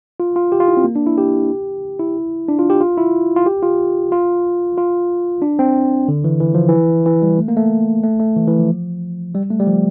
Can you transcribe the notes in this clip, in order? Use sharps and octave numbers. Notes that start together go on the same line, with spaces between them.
F4
F4
G4
F4
E4
C4
A#3
D4
E4
G4
E4
D4
F4
G4
F4
E4
F4
G4
F4
F4
F4
D4
C4
D3
E3
E3
F3
E3
E3
G3
A3
A#3
A3
A3
A3
E3
E3
F3
G3
A3
G3
F3